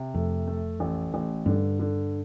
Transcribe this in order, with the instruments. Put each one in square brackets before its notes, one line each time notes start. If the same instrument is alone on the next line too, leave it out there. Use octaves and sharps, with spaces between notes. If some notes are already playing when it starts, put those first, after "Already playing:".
Already playing: [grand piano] C3
[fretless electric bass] F2 [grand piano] A3
[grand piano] A3
A1
A1
[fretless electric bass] G2 [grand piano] D3
[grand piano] D3